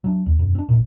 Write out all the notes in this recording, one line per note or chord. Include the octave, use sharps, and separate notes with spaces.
F#3 D4
D#2
E1 F#2
C4 D4
G#1 A#2